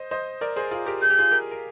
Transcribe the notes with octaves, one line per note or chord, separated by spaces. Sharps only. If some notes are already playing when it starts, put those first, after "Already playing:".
Already playing: C5 D#5
C5 D#5
A#4 D5
G#4 C5
F4 G#4
G4 A#4
G#4 G6
G4
F4 G#4
G4 A#4
A#4